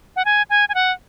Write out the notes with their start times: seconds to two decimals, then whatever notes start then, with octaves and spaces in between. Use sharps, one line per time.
0.16 F#5
0.25 G#5
0.50 G#5
0.69 G#5
0.75 F#5